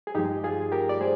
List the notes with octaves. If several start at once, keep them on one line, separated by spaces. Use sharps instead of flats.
G#4
G2 F3 G#3 D#4 G4
F4 G#4
G4 A#4
D5
G#3 G#4 C5